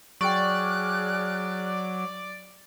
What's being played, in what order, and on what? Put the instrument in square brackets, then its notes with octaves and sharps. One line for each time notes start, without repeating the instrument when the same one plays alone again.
[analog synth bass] F#3 [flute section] G#4 F6 F#6 [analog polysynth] D5 [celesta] G5 C#6